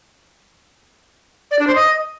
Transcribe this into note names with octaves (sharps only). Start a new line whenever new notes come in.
D5
D4
C5
D#5